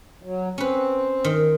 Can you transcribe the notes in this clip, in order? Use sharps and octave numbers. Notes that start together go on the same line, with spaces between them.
F#3
C4 C#4 B4
D#3